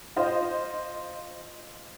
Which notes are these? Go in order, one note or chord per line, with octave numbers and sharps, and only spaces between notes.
F4 C5 D#5 F5